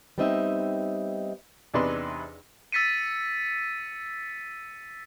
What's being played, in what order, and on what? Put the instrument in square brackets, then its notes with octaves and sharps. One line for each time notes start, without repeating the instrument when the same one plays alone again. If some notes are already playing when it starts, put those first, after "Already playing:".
[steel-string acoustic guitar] G3 B3 C4 D#4 D#5 E5
[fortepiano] E2 C3 D4 D#4 B4 C6
[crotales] E6 A6 B6 C#7 D#7